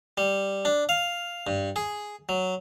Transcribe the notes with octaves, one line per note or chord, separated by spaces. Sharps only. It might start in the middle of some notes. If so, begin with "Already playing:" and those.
G3
D4
F5
G2
G#4
F#3